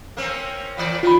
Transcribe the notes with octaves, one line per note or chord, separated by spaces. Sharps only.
A#3 C4 C#4
A#2 E3 D5
D#3 F4 B5